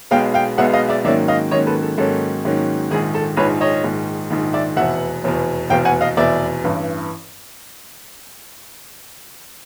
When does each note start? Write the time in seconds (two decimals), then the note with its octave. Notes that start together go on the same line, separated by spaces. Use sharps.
0.11 B1 B2 G#3 B3 F5 G5
0.34 F5 G5
0.58 B1 B2 G#3 B3 E5 F#5
0.73 D#5 F5
0.88 D5 E5
1.04 G#2 D#3 F#3 A#3 C#4 D5 E5
1.28 D#5 F5
1.51 G#2 D#3 F#3 A#3 C#4 C#5 D#5
1.67 A4 B4
1.82 A4
1.98 G#2 D#3 F#3 A#3 C#4 A4
2.45 G#2 D#3 F#3 A#3 C#4
2.91 A#1 G#2 D#3 G#4
3.14 A4
3.37 A#1 G#2 D#3 B4 C#5
3.61 C#5 D#5
3.84 A#1 G#2 D#3
4.30 A#1 G#2 D#3
4.53 D5 E5
4.77 F1 E2 B2 E5 F#5
5.24 F1 E2 B2
5.70 F1 E2 B2 F5 G5
5.85 F#5 G#5
6.01 D#5 F5
6.17 F1 E2 B2 D5 E5
6.64 A1 G2 E3